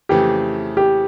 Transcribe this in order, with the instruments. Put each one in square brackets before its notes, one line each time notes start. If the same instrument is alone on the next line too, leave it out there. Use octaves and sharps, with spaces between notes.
[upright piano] F2 C#3 E3 A3 [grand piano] G4
[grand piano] G4